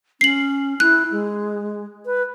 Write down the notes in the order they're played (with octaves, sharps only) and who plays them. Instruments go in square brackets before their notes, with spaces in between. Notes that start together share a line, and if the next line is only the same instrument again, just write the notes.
[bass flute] C#4 [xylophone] C7 F#7
[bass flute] E4 [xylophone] F#6
[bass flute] G#3
B4